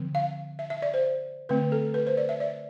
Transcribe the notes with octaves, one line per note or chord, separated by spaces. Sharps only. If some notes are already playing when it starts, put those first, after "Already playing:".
Already playing: D3 F3 C4
F5
E5
E5
D5
C5
D3 A3 C4 B4
A4
B4
C5
D5
E5
D5